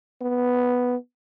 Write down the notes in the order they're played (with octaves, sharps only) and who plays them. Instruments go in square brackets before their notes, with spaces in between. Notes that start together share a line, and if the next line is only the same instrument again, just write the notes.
[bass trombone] B3